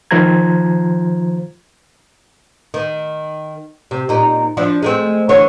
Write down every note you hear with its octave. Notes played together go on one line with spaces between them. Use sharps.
D#3 F3 F4 C5 A#5 G#6
D#3
C3
A#2 D#4
F3 D4 E4
G#3 A3 C4
D3 E3 C#5